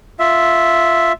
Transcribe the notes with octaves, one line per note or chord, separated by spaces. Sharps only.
F4 E5